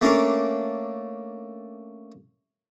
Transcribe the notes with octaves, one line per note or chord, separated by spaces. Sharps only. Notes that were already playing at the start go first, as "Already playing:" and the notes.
A3 A#3 C#4 D4 A#4